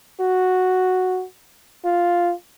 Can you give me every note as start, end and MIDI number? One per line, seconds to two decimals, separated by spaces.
0.21 1.24 66
1.85 2.32 65